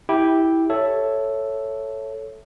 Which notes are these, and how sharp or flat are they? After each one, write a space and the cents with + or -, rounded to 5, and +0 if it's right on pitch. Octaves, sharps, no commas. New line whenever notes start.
E4 -15 G4 +0 G5 +0
A4 +0 C#5 +0 E5 +0